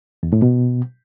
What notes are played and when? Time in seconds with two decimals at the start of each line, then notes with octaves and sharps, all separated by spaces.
0.23 E2
0.33 A2
0.42 B2